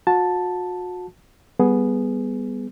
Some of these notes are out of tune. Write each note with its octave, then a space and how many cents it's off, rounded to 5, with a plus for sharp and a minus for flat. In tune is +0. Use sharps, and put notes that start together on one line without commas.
F#4 -40 A5 +0
G3 +5 B3 +0 G#4 +15